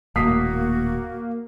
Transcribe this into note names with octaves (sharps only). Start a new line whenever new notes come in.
D#1 A2 A#3 F#4 D#6 B6 C7